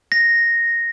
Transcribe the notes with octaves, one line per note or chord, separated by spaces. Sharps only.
A#6